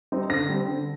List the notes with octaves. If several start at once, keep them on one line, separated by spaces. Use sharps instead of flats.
G3 C4 D#4
D3 A#6
G3 C4
D3